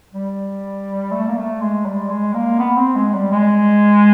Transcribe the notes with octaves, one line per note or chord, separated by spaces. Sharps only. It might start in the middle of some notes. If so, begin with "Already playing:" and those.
G3
A3
A#3
A3
G#3
G3
G#3
A#3
B3
C4
G#3
G3
G#3